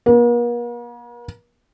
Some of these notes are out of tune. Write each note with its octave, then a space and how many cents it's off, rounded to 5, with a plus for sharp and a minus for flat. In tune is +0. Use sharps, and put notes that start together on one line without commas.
A#3 +45